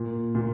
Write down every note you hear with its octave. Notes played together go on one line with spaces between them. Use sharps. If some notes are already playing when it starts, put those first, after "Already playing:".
Already playing: A#2
A#2